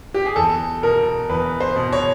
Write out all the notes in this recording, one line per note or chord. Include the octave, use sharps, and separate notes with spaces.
G4
G#4
E2 A4
B2 A#4
E2 B4
C5
B2
C#5